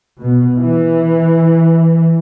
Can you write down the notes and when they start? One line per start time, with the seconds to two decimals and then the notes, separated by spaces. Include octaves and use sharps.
0.20 B2
0.58 E3